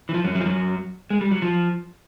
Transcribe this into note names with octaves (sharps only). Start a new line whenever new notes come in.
E3
F3
F#2 F#3
F#2 F#3
F3
F#2 F#3
G#3
G3
F#3
F3